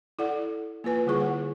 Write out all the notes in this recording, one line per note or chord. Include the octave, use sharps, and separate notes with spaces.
E4 A4 D5 F#5
A#3 F4 B4 G#5
D3 G3 E4 G#4 C#6
F#5